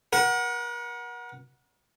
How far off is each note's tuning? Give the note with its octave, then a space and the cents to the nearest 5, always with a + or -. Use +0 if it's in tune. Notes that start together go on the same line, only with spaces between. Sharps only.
A#4 +40 F#5 +0